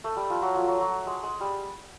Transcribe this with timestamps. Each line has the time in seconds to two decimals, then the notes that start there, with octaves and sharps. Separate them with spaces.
0.04 A3
0.16 G3
0.30 F3
0.42 F#3
0.56 F3
0.67 F#3
0.81 F#3
1.07 G#3
1.23 G#3
1.40 G3